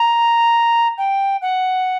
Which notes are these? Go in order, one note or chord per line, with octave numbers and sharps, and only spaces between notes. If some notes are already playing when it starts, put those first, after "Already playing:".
Already playing: A#5
G5
F#5